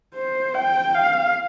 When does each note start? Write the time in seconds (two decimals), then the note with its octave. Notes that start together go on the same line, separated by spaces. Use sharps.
0.15 C5
0.55 G5
0.95 F5